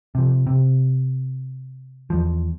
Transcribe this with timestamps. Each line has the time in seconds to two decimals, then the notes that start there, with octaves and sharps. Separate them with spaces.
0.15 C3 F3
0.47 C3
2.10 E2 F3